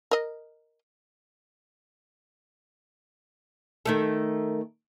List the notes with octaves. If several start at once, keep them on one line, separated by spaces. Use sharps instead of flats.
A#4 D#5
D#3 A3 A4